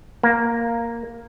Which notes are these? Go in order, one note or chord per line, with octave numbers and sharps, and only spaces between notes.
A#3